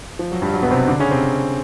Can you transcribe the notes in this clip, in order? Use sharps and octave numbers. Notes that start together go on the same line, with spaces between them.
F3
F#3
G2 G3
F#3
B2 B3
C3 C4
D3 D4
C#3 C#4
C3 C4